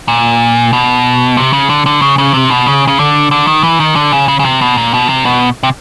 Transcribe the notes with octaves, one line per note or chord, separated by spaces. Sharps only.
A#2
B2
C3
C#3
D3
D3
C#3
C#3
C3
B2
C#3
C#3
D3
D3
D#3
E3
D#3
D3
C#3
C#3
C#3
C3
B2
A#2
B2
C3
B2
C3